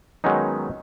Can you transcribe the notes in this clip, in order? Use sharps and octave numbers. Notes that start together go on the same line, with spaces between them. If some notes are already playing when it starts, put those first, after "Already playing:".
D#3 F#3 G#3 B3 C#4 D#4